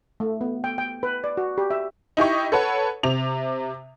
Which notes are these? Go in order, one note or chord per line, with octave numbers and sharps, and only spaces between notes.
A3
B3
G5
G5
B4
D5
F#4
G4
E5
D#4 E4 G4 C#6
A4 B4 C#5 F#5
C3 F7